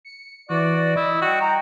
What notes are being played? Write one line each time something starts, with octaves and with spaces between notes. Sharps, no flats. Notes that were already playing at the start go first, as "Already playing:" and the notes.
C#7
E3 F#4 D5
E4 D#5
G3 F#4 F#5 G5
A#5